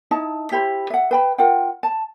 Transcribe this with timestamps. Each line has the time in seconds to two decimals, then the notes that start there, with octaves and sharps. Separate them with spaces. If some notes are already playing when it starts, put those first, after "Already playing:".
0.11 D#4 E4 D#5 A5
0.51 E4 G4 C5 B5
0.90 E5 F#5
1.11 B4 G5 B5
1.38 F4 A#4 F#5 G5
1.83 A5